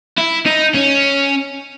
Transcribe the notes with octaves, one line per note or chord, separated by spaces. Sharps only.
E4
D#4
C#4